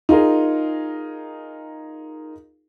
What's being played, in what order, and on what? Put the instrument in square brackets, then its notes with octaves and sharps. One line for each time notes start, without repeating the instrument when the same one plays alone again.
[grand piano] D#4 F4 G#4 A#4